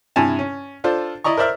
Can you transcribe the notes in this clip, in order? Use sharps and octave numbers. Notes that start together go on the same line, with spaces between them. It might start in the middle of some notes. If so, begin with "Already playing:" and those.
G2 C3 E4 G#5 A5
C#4
D4 F4 A4 C5
E4 D5 D#5 A#5 C#6
A#4 C5 D5 E5 F6